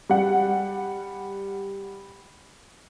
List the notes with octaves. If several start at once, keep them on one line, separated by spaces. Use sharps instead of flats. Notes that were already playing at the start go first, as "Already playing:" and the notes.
G3 F#5